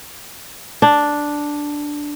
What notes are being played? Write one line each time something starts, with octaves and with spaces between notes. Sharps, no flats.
D4